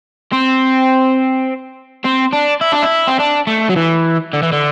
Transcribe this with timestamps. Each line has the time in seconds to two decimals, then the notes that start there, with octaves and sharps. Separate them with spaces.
0.32 C4
2.04 C4
2.33 D4
2.61 E4
2.72 D4
2.83 E4
3.07 C4
3.19 D4
3.47 A3
3.69 F#3
3.76 E3
4.33 D3
4.43 E3
4.52 D3